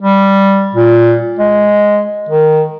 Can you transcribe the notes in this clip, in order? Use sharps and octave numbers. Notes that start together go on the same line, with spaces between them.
G3
A#2
G#3
D#3